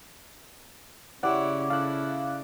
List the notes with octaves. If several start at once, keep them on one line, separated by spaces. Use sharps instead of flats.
C#3 E4 G4 C#5 D5 F#5
E4 A4 F5 F#6